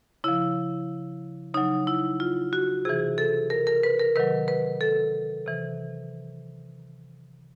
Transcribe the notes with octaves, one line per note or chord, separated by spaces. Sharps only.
C#3 F3 E4
C#3 F#3 D#4
E4
F4
F#4
C3 E3 G#4
A4
A#4
A#4
B4
A#4
C3 D#3 F#3 B4
B4
A4
C3 E3